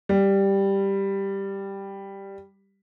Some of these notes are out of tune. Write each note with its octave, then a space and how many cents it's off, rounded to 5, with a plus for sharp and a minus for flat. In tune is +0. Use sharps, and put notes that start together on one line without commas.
G3 +5